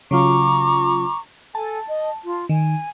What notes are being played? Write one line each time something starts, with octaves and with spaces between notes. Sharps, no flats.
C#3 F#3 F4 A#5 C#6 D6
A4 G#5 A5
D#5
F4
D#3 G#5